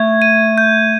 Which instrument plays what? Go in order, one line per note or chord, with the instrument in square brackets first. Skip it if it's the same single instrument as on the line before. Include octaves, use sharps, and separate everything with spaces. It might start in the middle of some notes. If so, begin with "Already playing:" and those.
Already playing: [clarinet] A3 [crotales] G#6
[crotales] D#7
G6